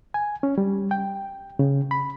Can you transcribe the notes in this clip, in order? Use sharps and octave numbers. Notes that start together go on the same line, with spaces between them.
G#5
C#4
G3
G5
C#3
B5